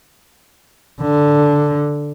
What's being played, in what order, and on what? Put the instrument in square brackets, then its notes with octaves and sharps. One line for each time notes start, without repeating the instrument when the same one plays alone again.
[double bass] D3